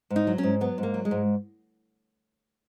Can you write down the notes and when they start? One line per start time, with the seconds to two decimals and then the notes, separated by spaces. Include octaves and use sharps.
0.10 G#2
0.16 D#4
0.27 F#3
0.38 C#4
0.43 G#2
0.61 F#3 B3
0.78 G#2
0.83 A#3
0.94 F#3
1.05 G#3
1.11 G#2